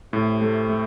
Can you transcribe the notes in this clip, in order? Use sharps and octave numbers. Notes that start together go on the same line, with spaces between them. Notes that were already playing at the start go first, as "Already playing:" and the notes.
A2 C3
A3
A3